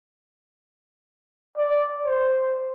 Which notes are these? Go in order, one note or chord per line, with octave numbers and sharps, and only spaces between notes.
D5
C5